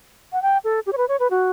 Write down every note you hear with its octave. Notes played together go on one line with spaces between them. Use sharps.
F#5
G5
A4
G4
C#5
B4
C#5
B4
F#4